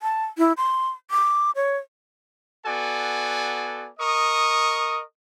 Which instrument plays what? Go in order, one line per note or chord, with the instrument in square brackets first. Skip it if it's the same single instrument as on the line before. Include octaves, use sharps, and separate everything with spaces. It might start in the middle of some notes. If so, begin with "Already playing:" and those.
[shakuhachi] A5
E4
C6
D6
C#5
[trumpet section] B3 F#4 A4 D5 G#5
A#4 D#5 C#6 D#6